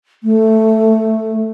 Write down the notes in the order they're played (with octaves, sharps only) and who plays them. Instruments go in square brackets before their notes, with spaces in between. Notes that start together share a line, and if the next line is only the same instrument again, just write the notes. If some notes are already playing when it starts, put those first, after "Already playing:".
[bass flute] A3